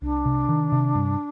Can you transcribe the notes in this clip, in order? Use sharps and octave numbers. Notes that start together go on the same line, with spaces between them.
C2 D4
C3
D#3
C3
G2